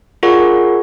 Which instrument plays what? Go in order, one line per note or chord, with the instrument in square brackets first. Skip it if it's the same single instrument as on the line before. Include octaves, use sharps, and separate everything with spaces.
[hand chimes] F4 G#4 A#4 D5 F#5 C#6